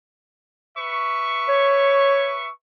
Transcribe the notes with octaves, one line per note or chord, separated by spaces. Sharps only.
B4 E5 C#6
C#5